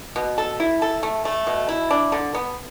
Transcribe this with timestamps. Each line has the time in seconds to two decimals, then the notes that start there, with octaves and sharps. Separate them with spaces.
0.16 B2
0.38 A4
0.60 E4
0.82 A4
1.03 A3
1.25 A3
1.47 B2
1.69 E4
1.91 D4
2.12 D3
2.35 B3